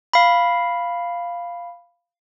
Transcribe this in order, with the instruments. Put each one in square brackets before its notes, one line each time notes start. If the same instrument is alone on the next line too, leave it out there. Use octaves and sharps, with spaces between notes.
[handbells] F5 B5